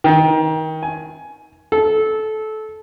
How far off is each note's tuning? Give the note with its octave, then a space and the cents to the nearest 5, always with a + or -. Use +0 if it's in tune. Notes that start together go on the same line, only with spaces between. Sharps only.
D#3 +25
G#5 +15
A4 -20